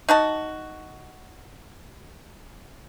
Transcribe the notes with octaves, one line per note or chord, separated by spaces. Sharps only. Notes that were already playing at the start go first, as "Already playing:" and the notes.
D#4 F#4 A5